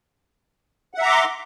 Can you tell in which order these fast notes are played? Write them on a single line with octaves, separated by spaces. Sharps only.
F#5 E5 A#5 D6 C6